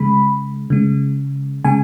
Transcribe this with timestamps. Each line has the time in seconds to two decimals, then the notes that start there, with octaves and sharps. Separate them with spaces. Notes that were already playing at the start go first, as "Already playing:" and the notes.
Already playing: C#3 G#3 B5
0.70 C#3 G#3
1.64 C#3 G#3 G#5